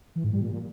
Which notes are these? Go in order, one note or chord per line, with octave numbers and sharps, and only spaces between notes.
E3
G#2
G3
A#2